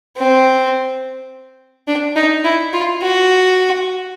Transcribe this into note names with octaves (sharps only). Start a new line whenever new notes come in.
C4
D4
D#4
E4
F4
F#4